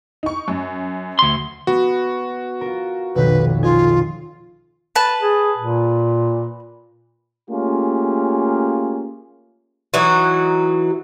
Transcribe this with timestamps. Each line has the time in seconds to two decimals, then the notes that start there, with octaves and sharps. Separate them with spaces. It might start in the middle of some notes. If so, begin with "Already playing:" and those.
0.23 D#4 C#6
0.48 F#2
1.19 D2 C6
1.67 B3 F#4
2.61 F4 A#4
3.15 F1 B1 D#3 B4
3.63 F4 D#5 G#5 G#6
4.95 B4 A5
5.21 G#4
5.58 A#2
7.51 A3 A#3 C#4 F4 G4 G#4
9.94 E3 F#3 D#4 F#4